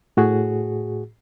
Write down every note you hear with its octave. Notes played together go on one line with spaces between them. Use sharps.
A2 F#4 G#4